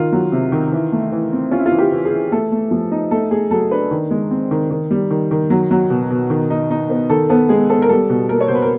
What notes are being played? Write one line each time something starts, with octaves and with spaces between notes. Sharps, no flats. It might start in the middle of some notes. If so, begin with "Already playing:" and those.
Already playing: D#3 F4
F#3
C3
D#3
E3
A3
E3
C4
C#4 F4
E4
F4
E3
G4
E3
G#4
E3
A3 A4
A3
F3
D#4
A3 A4
A3 G#4
F#3 A4
D4 B4
D#3
G#3
C4
D#3
D#3
G3
D#3
D#3
F#3
F#3
B2
B2
D#3
D#4
D#4
B3
D#3 A4
B3 A4
G#3 G#4
B3 A4
A#4
G3 A4
B2
A#3 A#4
C#5
B2 C5
B4
A#4